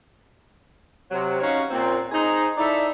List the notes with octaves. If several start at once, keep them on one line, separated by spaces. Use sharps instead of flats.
C3 F#3
C#4 D#4 F#4 C#5 F5 F#5
A#2 C4
D#4 G#4 C5
D#4 E4 A4 D5 E5